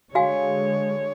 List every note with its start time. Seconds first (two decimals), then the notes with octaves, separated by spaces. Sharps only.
0.15 D3 G#3 F#4 C#5 F5 G#5